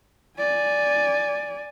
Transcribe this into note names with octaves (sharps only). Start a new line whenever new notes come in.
D5 G#5